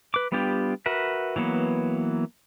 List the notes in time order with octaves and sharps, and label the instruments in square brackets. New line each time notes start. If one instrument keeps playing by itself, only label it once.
[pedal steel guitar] B4 D6
G3 B3 D4 F4 G4
F#4 A#4 B4 E5
E3 F#3 A#3 B3